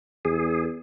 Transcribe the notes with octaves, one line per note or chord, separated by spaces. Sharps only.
E2 G#4